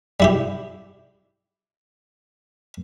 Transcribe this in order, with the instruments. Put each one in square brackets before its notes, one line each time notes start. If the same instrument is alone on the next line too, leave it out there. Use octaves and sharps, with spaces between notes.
[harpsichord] G3 E4 G4